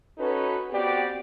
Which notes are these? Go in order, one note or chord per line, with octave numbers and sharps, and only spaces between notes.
C#4 D#4 F#4 A4 B4
B3 C4 F#4 G4 D5